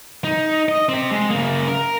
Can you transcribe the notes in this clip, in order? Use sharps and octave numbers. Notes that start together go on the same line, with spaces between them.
D#4
D#5
C4 G4
G#3
C#3 A#3
A#4